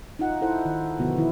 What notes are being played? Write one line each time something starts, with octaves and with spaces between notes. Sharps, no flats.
D#4 F4 F#5
E4 A4 C5 F#5
D#3
B2 D3 F3 B3 F#4
D#3 E4